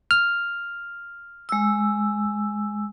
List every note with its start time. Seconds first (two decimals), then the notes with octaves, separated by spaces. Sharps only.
0.11 F6
1.49 G#3 E6